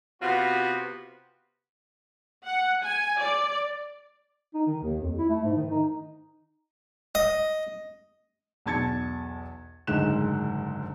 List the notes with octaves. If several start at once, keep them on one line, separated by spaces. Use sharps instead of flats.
C3 B3 F4 F#4
F#5
G#5
D5
D#4
D#3
D#2
F2
E4
A3
G#2
D#3
D#4
D#5
B1 E2 A5 G#6 A6 C#7
F#1 D2 G#2 G#3 F#6 E7